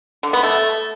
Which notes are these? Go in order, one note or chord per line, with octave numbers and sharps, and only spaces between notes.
D3
B3
A3